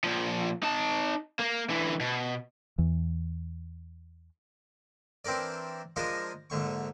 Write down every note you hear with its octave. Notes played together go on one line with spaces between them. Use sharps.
A#2 F3
D#4 A5
A#3
D3 E3
B2
E2 E3
E3 C4 D4 A#4 D5
F3 G#3 D4 A#4 D#5
A#1 G#2 D3 C#6